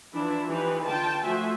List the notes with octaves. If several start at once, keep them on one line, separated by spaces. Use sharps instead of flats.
E3 F3 D4 E4
E3 F3 D#4 G4 B4
D3 F4 G5 A5
F3 A3 F#4 C5 E5 G#5